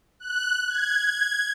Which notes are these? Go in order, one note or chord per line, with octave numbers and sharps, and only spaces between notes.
F#6
G#6